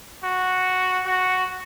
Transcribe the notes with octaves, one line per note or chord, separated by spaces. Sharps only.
F#4
F#4